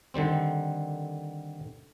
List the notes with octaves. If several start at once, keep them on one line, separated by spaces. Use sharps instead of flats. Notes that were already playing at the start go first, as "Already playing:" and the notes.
D3 D#3 G3 C4